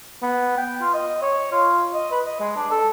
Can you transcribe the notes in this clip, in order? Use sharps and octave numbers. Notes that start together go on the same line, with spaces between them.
B3
G5
F4
D#5
C#5
F4
D#5
B4
D#5
G#3
D4
A4